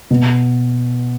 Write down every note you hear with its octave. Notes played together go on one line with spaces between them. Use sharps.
B2